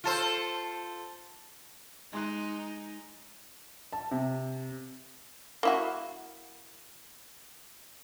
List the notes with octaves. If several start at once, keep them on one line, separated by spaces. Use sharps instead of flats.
F4 A4 C5
G#3 D#4 C6 F#6
A5
C3
A#3 E4 F#4